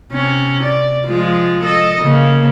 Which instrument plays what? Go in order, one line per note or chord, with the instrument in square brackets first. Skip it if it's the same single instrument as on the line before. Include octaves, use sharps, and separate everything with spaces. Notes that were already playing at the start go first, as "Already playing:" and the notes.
[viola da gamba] C3 C#4
D5
F3 G#3 F4
A4 D#5
C#3 A#3